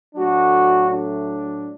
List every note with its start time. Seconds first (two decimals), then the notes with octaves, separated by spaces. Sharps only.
0.15 A2 F#3 A3 D4 F#4
0.91 D4